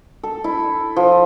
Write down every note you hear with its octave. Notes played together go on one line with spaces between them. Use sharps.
A4
E4
F3